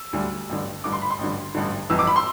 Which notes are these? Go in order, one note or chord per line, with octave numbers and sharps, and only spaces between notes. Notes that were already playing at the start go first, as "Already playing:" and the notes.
Already playing: E6
D2 D3 G3
A1 G2 D3
A1 G2 D3 D6
C6
B5
C6
A1 G2 D3
A1 G2 D3
G1 F2 E3 E6
D6
B5
C6